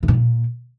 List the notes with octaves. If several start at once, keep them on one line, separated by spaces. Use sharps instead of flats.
C3
B2
A#2